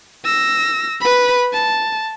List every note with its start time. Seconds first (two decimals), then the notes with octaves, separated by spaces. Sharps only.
0.25 E6 A#6
1.01 B4 B5
1.53 A5